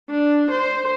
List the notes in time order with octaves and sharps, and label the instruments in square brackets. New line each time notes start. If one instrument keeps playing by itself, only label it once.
[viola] D4
C5